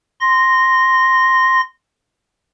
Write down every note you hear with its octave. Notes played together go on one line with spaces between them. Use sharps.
C6 A#6